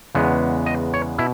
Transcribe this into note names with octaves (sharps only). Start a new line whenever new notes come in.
E2 C#3 G#3 B3
D#5
C#5
B2 E4